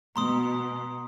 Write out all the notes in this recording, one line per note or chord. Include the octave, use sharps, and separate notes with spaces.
B2 A#5 C6 D#6